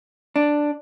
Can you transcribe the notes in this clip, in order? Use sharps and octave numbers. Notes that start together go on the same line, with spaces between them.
D4